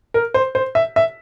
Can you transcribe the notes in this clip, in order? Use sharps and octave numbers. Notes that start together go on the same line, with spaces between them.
A#4
C5
C5
E5
E5